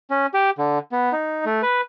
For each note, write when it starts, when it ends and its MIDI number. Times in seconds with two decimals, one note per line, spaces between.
0.10 0.26 61
0.34 0.50 67
0.58 0.79 50
0.92 1.12 59
1.12 1.45 63
1.46 1.62 57
1.62 1.81 71